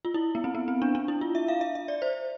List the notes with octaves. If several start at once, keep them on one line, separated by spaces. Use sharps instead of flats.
F4
E4
B3
C4
B3
C4
D4
D4
E4
F4
E5
F5
E5
E5
D5
C5